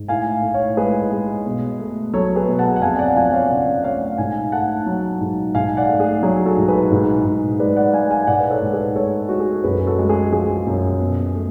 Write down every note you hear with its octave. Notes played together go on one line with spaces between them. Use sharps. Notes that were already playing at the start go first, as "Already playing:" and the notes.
Already playing: G#2
A2 F5 G#5
A2
C#5 F5
G#3 G#4 B4
G#3
B2
A3
F#3 A4 C#5
G#4 B4
B2
F#5 A5
F#5
F2 F5 G#5
D5 F#5
F3 F5 G#5
C#5 F5
C#3 D5 F#5
A3 C#5 F5
G#2 F5 G#5
A3 F#5 A5
F#3
G#2
G#2 F5 G#5
D5 F#5
A3
G#4
F#3 G#4
F#4 A4
G#2
G#4 B4
G#2
G#2
G#3 B4 D5
D5 F#5
G#3 F5 G#5
F5 G#5
G#2 D5 F#5
B4
A4 C#5
G#2
G#4 B4
G#3 A4 C#5
G#3 F#4
G#4
A4
F#2 G#4 B4
F#4 A4
G#3
G#4
F3 G#4
F#2
B2
A3